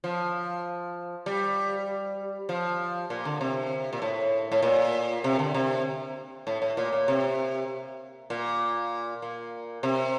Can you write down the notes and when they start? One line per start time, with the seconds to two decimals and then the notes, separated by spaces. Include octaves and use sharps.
0.04 F3
1.26 G3
2.49 F3
3.10 A#2
3.25 D3
3.41 C3
3.93 A#2
4.02 A2
4.52 A2
4.63 A#2
5.24 C3
5.39 D3
5.54 C3
6.47 A2
6.62 A2
6.77 A#2
6.92 A#2
7.08 C3
8.30 A#2
9.22 A#2
9.83 C3